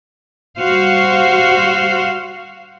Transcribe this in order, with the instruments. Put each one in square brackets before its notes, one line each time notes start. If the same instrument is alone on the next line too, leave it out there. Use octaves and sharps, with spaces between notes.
[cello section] G3 F#4 C5 F5